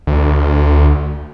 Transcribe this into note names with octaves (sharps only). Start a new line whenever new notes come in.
D2